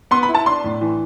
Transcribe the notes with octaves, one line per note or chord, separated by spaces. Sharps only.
B3 C6
B5
E4
A5
D4 C6
A2
E3